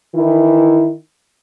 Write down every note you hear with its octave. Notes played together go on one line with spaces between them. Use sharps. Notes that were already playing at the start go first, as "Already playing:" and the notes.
D#3 E3 E4